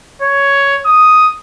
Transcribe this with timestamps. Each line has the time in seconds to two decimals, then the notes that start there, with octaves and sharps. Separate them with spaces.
0.22 C#5
0.86 D#6